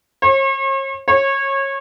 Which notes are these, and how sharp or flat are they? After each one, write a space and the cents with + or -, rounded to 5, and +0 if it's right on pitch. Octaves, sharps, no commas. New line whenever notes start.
C#5 -45
C#5 -25